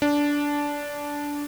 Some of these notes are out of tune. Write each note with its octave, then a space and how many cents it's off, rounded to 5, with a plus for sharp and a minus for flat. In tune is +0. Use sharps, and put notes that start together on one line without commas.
D4 -15